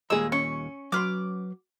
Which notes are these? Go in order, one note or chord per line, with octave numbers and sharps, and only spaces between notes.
D#2 A#2 G3 G#3 G#4 E6
C#4 C#6
F#3 B4 C6 D6 F6